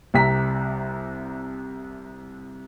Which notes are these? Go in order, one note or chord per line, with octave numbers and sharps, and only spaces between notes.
C2 C3 A#5 B6